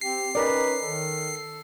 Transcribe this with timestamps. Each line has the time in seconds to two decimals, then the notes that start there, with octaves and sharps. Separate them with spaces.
0.01 C4 G4 C7
0.35 C#4 D#4 A#4 B4 D5
0.82 D#3 A4